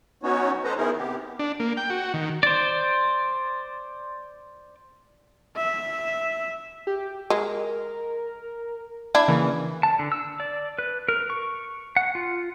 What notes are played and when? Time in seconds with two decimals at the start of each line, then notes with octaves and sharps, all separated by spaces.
0.23 F#3 B3 C#4 D#4 F#4 C#5
0.64 A4 B4 C5 D#5 A#5
0.77 D#3 B3 D#4 E4 G#4 A#4
0.98 C3 B3 G4
1.39 D4
1.60 A#3
1.77 G5
1.90 F#4
2.14 D#3
2.43 C5 D5
5.57 E5
6.87 G4
7.30 G#3 A#4
9.15 D4 E4 G#6
9.28 C#3 E3 A#3
9.83 A5
9.99 D3
10.12 E6
10.40 D5
10.79 B4
11.08 A#4
11.30 C#6
11.97 F#5
12.15 F4